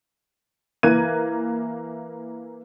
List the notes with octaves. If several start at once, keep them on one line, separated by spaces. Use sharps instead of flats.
E3 A#3 F#6 G#6 D#7